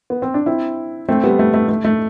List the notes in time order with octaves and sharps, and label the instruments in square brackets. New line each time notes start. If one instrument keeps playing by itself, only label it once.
[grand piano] B3
C4
D4
C4 E4
A3 C4
G3 B3
A3
A3
A3
A3